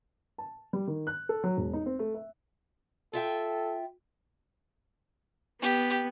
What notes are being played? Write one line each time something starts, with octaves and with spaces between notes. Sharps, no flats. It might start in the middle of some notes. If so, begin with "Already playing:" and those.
A5
G3
D#3
F#6
A4
F#3
E1
D#4
C4
A3
E5
F4 A4 E5 G5
B3 G4